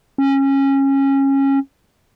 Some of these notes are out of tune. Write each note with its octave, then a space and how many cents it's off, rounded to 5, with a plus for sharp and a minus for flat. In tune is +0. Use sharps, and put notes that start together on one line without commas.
C#4 -20